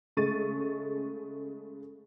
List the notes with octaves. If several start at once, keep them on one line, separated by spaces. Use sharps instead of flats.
C#3 G#3 A3 C#6 A6 D#7